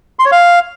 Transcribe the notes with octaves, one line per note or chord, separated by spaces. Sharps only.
C6
C#5
F5